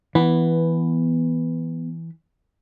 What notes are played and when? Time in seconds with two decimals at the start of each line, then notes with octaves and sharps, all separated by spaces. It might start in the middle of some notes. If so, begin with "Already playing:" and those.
0.15 E3 B3